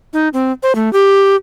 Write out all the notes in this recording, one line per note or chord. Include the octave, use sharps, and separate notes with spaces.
D#4
C4
C5
A3
G4